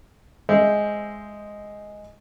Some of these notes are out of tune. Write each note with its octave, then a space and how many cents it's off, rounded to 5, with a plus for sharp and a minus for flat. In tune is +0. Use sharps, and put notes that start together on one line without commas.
G#3 +0 C5 +0 E5 +0